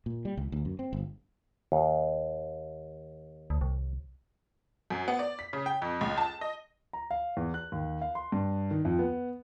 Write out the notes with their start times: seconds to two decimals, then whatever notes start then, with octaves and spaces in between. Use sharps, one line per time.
0.06 A#2
0.25 G3
0.37 C#2
0.52 D2
0.65 F#2
0.79 C4
0.93 G1
1.72 D#2
3.50 D2
3.61 C2
4.90 F#2
5.08 B3
5.19 D5
5.39 B6
5.53 C#3
5.66 G5
5.82 F2
6.01 C#2
6.18 A5
6.41 D#5
6.93 A#5
7.11 F5
7.37 E2
7.54 F#6
7.72 D#2
8.01 F5
8.15 C6
8.32 G2
8.71 D#3
8.85 F2
8.99 B3